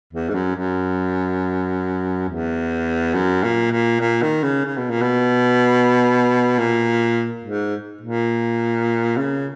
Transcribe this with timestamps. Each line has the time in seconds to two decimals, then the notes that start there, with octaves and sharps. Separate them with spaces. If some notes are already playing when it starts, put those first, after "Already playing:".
0.13 E2
0.29 G#2
0.34 F#2
0.56 F#2
2.28 E2
3.14 F#2
3.43 A#2
3.71 A#2
4.00 A#2
4.22 D#3
4.43 C#3
4.65 C#3
4.77 B2
4.90 A#2
5.02 B2
6.58 A#2
7.45 G#2
8.01 A#2
9.17 C#3